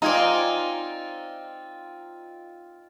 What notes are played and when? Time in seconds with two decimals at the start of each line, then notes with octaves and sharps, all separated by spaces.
0.02 C4 D#4 F4 D5 G#5 A#5